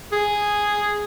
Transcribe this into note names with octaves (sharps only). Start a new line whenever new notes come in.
G#4